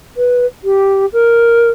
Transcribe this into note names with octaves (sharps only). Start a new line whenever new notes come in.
B4
G4
A#4